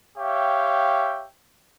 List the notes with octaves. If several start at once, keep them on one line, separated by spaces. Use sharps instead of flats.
G4 C#5 E5 F5 G5